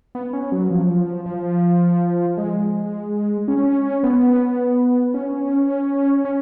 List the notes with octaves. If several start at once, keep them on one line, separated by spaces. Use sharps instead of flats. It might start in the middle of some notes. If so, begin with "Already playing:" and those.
B3
C#4
F#3
F3
F3
G#3
C#4
B3
C#4
C#4